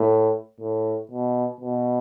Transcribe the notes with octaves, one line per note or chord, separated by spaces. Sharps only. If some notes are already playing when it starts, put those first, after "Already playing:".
Already playing: A2
A2
B2
B2